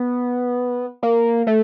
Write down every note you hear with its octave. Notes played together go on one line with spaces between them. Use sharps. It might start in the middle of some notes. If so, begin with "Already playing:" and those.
Already playing: B3
A#3
A3